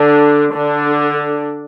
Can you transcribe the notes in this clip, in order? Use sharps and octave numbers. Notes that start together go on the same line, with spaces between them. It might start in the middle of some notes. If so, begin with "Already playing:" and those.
Already playing: D3 D4
D3 D4